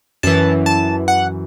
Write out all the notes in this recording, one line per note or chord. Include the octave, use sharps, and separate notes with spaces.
F#2 E3 A5
A5
F#5